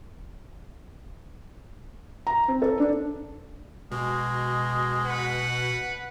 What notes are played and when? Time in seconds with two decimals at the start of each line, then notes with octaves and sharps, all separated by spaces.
2.27 A#5
2.48 C4
2.62 A4
2.80 D4
3.92 B2 G#3
5.02 B4 F#5